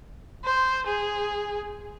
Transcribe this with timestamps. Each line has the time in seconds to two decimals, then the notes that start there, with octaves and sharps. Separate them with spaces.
0.45 C5
0.86 G#4